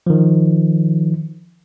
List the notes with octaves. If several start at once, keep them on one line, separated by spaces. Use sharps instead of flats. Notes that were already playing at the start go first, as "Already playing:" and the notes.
D#3 F3